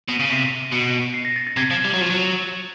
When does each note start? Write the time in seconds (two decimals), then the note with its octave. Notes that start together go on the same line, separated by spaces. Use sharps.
0.08 B2 D#7
0.20 C#3
0.30 C3
0.72 B2 C#7
1.14 C7
1.25 A#6
1.36 A6
1.47 A6
1.57 C3 G#6
1.71 F3
1.85 G3
1.94 F#3
2.01 F3
2.10 F#3